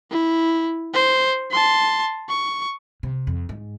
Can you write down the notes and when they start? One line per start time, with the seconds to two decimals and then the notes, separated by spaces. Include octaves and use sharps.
0.11 E4
0.94 C5
1.51 A5 C6
2.29 C#6
3.03 C3
3.27 F2
3.49 G#2